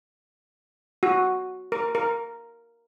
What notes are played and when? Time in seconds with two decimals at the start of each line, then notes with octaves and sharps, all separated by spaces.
1.03 F#4
1.72 A#4
1.95 A#4